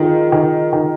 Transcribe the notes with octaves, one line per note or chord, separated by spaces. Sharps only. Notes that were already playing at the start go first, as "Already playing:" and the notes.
Already playing: D#3 F4 G#4
D#3
D#3